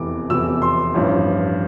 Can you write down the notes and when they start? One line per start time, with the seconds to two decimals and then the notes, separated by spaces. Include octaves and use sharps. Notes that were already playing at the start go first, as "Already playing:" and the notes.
Already playing: F1 E2 C3 E3 D6
0.30 F1 E2 C3 E3 E6
0.62 C6
0.94 A1 G2 F3